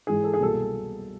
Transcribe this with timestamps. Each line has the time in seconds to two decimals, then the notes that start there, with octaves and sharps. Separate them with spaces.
0.07 G#2 E3 G#3 G#4
0.24 A4
0.34 G#4
0.41 C2 B2 F#3 A#3 A4